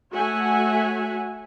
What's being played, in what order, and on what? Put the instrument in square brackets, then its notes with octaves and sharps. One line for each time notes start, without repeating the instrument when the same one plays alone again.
[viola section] A3 F#4 C#5 E5 F#5 G#5